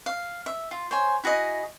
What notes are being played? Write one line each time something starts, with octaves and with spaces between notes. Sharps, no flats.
F5
E5
F4
C5 C#5 G#5
E4 F#4 G#4 D#5